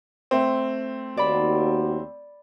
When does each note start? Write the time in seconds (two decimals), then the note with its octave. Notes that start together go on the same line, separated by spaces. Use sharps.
0.31 A3 C4
1.17 D#2 F#4 D5 B5